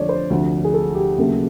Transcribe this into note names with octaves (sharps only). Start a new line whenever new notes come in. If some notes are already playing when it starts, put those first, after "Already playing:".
Already playing: F2 D3 F3 A3 C#5 D5
C5
D2 C3 F3
G#4
A4
G4
D#2 C#3 F#3 A3